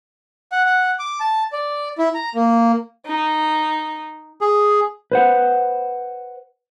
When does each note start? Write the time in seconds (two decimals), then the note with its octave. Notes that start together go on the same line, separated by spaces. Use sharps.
0.52 F#5
0.66 F#5
0.99 D6
1.20 A5
1.53 D5
1.98 E4
2.15 A#5
2.35 A#3
3.04 D#4
4.41 G#4
5.12 B4 C5 F#5